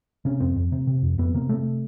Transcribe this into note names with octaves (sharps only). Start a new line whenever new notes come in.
C3 C#4
F2 C4
F2
C3
C3
F2
F2 B3
C3 A#3
C3 A3